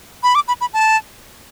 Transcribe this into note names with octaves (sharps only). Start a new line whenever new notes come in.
B5
D6
B5
B5
A5